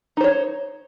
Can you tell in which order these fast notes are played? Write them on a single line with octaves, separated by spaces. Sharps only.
D#4 C5 C#5